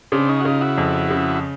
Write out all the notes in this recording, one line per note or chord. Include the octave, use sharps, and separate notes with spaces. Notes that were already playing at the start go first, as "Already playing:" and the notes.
C#3 C4 D4
C#4 D#4
F#4
C#3 D#4 F4
E4 F#4
F2
C#3